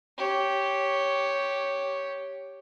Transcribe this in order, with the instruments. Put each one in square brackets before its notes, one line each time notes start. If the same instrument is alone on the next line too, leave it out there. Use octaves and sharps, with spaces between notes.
[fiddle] G4 C#5